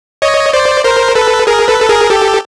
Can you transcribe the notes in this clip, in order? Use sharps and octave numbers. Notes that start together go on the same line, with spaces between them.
C#5 D#5
C5 D5
A#4 C5
A4 B4
G#4 A#4
A4 B4
A4
G#4 A#4
G4 A4